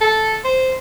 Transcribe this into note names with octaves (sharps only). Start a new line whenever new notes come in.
A4
C5